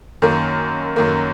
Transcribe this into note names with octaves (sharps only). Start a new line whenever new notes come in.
F#2 D#3 A#3
F#2 D#3 A#3